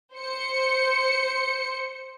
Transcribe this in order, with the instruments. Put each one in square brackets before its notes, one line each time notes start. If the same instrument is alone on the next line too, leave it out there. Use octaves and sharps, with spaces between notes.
[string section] C5 C#7